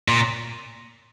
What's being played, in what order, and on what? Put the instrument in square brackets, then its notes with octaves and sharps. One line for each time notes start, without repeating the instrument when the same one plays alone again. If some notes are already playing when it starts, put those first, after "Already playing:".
[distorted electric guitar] A#2